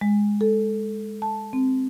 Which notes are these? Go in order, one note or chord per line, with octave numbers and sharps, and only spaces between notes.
G#3
A4
A5
C4